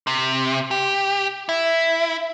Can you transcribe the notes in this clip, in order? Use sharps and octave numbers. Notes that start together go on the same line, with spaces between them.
C3
G4
E4